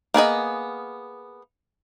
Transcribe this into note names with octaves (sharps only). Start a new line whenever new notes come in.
A#3 B3 G#4 D#5